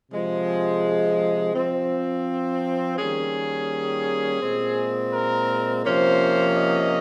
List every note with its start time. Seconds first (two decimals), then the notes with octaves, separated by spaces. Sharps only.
0.11 C3 F3 G#3
1.54 F3 C4
2.97 D#3 G3 A#3 C#4 G#4
4.41 A#2 G#3 C4
5.12 A#4
5.84 C3 F3 A#3 C#4 C5
6.56 D#5